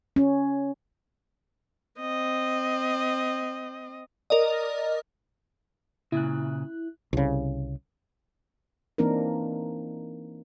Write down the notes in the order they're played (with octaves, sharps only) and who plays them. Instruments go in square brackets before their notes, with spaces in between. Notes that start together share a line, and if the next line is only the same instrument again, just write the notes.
[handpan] C#4
[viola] C4 D#5
[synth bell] A#4 D5 D#5
[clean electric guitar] A#2 C#3 [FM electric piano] E4 F#6
[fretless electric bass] C2 C#3
[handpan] E3 A#3 C4 D4 D#4 A#4